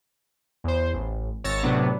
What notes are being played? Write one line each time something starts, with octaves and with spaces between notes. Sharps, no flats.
E2 C5
A1
G#1 C#5 E6 A6 A#6 C#7
A2 C3 F#3 B3 D4